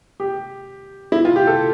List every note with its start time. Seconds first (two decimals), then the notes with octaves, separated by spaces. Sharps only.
0.20 G4
1.12 E4
1.25 F4
1.36 G4
1.47 A4